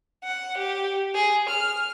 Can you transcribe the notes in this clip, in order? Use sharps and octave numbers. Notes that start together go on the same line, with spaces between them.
F#5
G4
G#4
F6